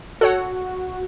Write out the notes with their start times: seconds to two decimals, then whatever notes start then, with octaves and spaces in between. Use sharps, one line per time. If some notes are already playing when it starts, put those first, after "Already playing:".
0.21 F#4 A4 C#5 F#5